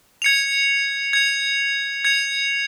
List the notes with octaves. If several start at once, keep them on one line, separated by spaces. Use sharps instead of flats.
G#6 C#7 F7
G#6 C#7 F7
G#6 C#7 F7